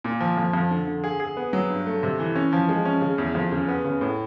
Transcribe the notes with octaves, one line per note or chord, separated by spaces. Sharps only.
A#2
F3
F2
F2
D3
D3
G#4
G#4
B3
F#3
G2
A3
C3
E3
C#4
F3
G#3
C#4
C#3
E2
F2
C#3
B3
C#3
A2